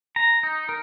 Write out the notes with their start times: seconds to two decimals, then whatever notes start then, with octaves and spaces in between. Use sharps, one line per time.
0.16 A#5
0.43 D#4
0.69 A#4